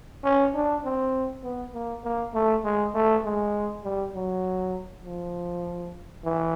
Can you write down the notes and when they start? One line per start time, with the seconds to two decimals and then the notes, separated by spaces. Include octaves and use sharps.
0.24 C#4
0.55 D4
0.85 C4
1.44 B3
1.74 A#3
2.04 A#3
2.34 A3
2.64 G#3
2.95 A3
3.25 G#3
3.84 G3
4.15 F#3
5.05 F3
6.25 E3